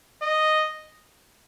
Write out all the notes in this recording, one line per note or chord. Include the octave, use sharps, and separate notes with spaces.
D#5